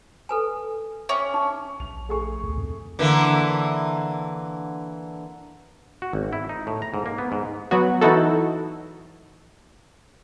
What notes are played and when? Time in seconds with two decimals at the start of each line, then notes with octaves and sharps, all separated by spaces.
0.29 A4 B4 G#5
1.09 C#4 E5 G5 D6
1.34 D#4
1.80 A#1 F7
2.09 A3 G#4 C#6
2.44 D2
2.58 F2
2.99 D3 E3 A#3
6.02 F#4
6.13 G#1
6.33 E4
6.49 D#4
6.67 A2
6.82 A#5
6.94 G#2
7.06 A#3
7.18 B3
7.32 G#2
7.71 F#3 B3 F#4
8.01 E3 D#4 E4 F#4 A4